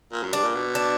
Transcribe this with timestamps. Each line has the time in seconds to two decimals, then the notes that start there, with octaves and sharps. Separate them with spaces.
0.13 A#2
0.23 F#2
0.33 G2 D4
0.44 A#2
0.55 B2
0.75 D4